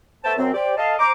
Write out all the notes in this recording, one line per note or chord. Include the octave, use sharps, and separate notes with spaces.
A3 B3 C5 E5 G5 A5
F#2 C4
G4 C5 D5 G5
A4 D#5 F5 A5
C5 A#5 D6